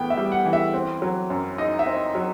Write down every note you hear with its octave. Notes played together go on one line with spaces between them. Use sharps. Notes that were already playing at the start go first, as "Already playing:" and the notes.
Already playing: A2 E3 B3 G5
E5
G3
F#5
E3
E5
C4
F#3
F#2
D#4 D#5
E5
C4
F#3